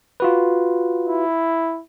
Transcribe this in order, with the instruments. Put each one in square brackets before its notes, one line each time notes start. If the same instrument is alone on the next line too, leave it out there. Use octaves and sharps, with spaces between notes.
[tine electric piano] F4 F#4 B4
[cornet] E4